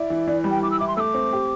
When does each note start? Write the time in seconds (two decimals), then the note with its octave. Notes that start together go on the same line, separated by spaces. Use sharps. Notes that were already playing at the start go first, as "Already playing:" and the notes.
Already playing: E4 D5
0.10 E3
0.27 E3 D5
0.44 G3
0.51 G5
0.62 E3 D6
0.71 E6
0.80 E4 D6
0.88 C6
0.97 A3 D6 E6
1.14 C4
1.33 G4